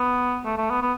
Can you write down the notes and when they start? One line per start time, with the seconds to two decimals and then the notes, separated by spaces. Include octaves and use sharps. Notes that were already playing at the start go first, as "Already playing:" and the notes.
Already playing: B3
0.45 A3
0.57 A3
0.70 B3
0.82 B3